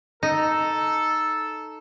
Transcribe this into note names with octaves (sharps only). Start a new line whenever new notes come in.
D#4 A4